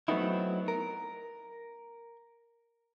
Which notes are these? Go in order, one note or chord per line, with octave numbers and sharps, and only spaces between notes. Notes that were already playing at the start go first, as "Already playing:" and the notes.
F#3 A3 B3 C4 D#4 E4
A#4